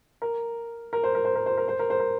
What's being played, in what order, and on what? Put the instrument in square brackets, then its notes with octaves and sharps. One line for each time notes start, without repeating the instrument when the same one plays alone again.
[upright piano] A#4
A#4
C5
A#4
C5
A#4
C5
A#4
C5
A#4
C5
A#4